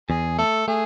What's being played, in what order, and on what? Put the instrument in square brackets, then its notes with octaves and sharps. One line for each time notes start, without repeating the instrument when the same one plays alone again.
[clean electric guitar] E2 [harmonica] G#4
[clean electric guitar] A3 [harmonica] A4
[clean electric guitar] A3 [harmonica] G#4